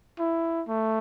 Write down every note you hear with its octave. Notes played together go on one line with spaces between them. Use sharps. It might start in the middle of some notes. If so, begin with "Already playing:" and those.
E4
A3